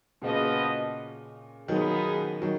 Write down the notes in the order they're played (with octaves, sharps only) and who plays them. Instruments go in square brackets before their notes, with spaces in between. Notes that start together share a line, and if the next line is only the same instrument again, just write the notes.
[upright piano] A#2 C#3 [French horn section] F3 B3 F#4 B4 D#5
[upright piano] D#3 F#3 [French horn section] F3 B3 D#4 G#4
[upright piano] D#3 F#3